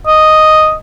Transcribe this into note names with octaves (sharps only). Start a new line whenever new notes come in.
D#5